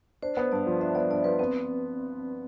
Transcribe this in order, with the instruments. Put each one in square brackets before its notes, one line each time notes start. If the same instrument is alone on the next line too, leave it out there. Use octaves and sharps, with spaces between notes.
[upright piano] D4 [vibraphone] C5
[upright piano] B3
[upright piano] G2 [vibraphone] D5
[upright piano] F3
[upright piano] D4 [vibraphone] E5
[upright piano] B3 [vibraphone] D5
[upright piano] G2 [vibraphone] D5
[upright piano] F3 [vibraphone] B4
[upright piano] B3 [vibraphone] C4